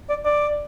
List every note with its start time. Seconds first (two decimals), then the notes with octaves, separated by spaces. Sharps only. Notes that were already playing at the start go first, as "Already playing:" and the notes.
0.09 D5
0.25 D5